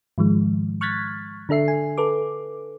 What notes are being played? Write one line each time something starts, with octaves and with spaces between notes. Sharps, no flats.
G#2 D#3 F3 G#3
C#6 F6 F#6 G#6 A6 B6
D3 D4 A4 E5 C7
G#5
A4 B4 D6